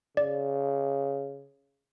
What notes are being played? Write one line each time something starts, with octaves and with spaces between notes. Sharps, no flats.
C#3 D5